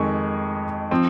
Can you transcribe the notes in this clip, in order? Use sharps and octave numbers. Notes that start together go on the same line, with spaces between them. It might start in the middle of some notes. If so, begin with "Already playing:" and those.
Already playing: F2 D#3 G#3 C4 C#6
F3 C4